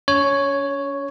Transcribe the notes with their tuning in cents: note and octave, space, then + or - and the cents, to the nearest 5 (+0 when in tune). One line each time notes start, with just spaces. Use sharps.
C#4 +40 C#5 +0